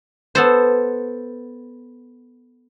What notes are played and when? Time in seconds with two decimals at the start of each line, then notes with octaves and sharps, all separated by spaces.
0.35 B3 A4 C5